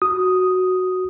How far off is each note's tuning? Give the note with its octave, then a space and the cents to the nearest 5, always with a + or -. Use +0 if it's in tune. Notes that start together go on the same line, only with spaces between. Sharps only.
F#4 +0 D#6 +0